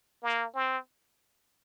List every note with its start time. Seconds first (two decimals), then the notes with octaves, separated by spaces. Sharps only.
0.23 A#3
0.55 C4